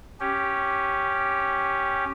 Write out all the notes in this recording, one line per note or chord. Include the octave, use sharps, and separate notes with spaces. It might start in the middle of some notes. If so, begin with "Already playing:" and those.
C#4 G4